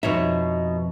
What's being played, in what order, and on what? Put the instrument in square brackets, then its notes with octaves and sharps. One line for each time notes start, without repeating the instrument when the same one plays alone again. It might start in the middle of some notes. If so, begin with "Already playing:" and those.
[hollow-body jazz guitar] F2 C#5 E5 [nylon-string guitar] B2 D#4